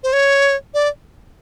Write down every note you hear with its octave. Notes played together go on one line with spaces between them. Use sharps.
C5
C#5
D5